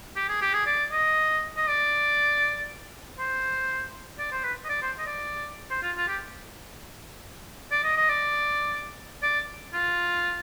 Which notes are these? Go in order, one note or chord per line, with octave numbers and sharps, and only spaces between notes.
G4
G#4
G4
G#4
D5
D#5
D#5
D5
C5
D5
C5
B4
D#5
D5
C5
D#5
D5
C5
F4
F4
G4
D5
D#5
D#5
D5
D5
F4